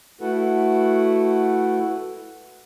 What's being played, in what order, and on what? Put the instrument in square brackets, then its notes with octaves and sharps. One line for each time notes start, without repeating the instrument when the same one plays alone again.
[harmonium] A3 E4 F#4 A4 B4 F#5